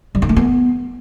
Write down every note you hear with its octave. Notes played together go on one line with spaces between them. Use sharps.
G3
D#4
A3
B3